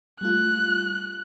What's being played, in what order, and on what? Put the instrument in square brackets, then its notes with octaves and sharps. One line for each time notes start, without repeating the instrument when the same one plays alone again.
[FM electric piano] G3 A3 F4 [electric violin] F#6